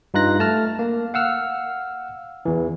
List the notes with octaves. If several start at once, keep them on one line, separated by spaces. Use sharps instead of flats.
G2 D#4 F4 F#6 A#6
A3 A5 F6
A#3
F5 F#5 E6 F6
E2 E3